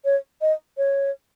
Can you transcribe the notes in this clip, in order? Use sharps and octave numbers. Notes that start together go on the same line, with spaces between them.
C#5
D#5
C#5